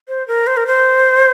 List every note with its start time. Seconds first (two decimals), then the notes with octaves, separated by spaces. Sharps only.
0.08 C5
0.28 A#4
0.47 C5
0.57 A#4
0.67 C5